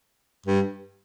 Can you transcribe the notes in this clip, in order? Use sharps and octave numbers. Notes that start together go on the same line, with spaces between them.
G2